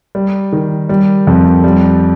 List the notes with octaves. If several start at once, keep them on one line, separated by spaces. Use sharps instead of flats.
G3
D#3
G3
F2
G3